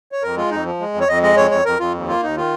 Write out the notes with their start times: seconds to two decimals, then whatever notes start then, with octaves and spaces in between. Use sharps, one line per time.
0.12 C#5
0.23 F2 A#4
0.36 G#3 F4
0.51 F2 D#4
0.65 F3
0.80 G#3
0.94 F2
1.01 C#5
1.08 F2 D#5
1.22 G#3 D#5
1.37 F2 C#5
1.51 F2 C#5
1.65 F2 A#4
1.80 F2 F4
1.94 D#2
2.08 A#3 F4
2.23 D#2 D#4
2.37 D#3 F4